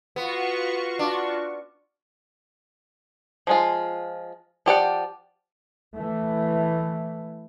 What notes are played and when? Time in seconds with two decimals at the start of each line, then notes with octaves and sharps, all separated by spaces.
0.16 B3 F4 F#4 C#6
0.99 D4
3.47 F3 G#3 F4
4.66 F3 G4 D5 F#5
5.94 E3 A3